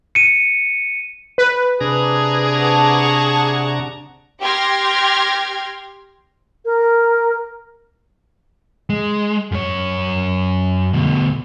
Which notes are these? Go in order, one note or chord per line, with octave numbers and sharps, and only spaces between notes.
C#7 D#7
B4
C3 D4 G#4 A#5
F#5 A5 C#6
G4 G5 C6 F6 G#6 A#6
A#4
G#3
F#2 C#5
D2 B2